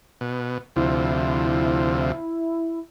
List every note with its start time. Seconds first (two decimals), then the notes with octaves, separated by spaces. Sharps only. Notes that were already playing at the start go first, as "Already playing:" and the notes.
0.21 B2
0.76 D2 C3 F3 E4